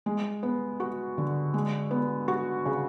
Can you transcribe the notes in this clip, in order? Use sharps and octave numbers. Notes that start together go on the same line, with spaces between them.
G#3
B3
F#4
D3
G#3
B3
F#4
C#3